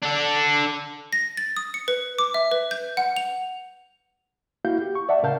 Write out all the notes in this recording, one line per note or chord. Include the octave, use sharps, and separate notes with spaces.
D4 A4
A#6
A6
D#6
C#7
B4
D6
E5
B4
G6
F#5
F7
A#3 E4 F#4 F5 G6
G4
C#6
D5 E5 F#5 A5
A2 C#3 A#4 F5 A5 G6